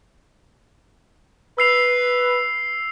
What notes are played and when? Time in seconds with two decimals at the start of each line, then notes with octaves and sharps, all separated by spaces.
1.58 B4 E6 C7 F7